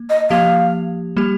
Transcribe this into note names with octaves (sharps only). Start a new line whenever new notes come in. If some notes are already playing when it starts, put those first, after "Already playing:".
Already playing: A#3
D#5
F3 A#3 G4 F5
G3 A#3 G4